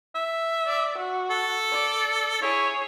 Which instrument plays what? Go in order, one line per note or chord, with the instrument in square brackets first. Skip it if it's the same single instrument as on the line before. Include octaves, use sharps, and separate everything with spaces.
[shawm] E5
[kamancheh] D5
F#4
[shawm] A4
[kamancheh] D5
[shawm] E4 [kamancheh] G#4 C#5